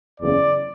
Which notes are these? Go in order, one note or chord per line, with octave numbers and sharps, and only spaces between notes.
F#1 E2 C#3 D5